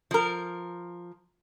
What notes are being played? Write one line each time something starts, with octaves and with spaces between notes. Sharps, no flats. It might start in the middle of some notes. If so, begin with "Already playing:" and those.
F3 A#4